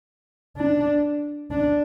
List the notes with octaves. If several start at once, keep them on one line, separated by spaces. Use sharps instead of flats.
D4
D4